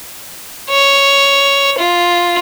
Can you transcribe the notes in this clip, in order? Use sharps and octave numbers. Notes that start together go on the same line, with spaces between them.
C#5
F4